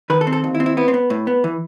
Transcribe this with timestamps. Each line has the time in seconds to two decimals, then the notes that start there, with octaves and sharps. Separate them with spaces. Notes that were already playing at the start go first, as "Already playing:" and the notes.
0.10 D#3 B4
0.21 A4
0.27 C4
0.33 A4
0.44 D#2
0.55 E4
0.60 C4
0.66 E4
0.77 B3 E4
0.88 C4
0.94 B3
1.10 A2
1.27 B3
1.44 E3